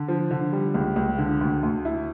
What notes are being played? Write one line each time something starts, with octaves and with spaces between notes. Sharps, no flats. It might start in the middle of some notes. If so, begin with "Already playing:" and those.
Already playing: D3
F3
D3
G3
C#2
C#2
D3
D2
D2
E4